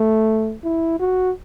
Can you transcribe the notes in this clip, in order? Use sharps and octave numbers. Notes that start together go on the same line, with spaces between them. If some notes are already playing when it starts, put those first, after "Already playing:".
Already playing: A3
E4
F#4